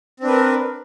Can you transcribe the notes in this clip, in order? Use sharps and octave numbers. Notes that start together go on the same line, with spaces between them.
C4 D4 A#4 B4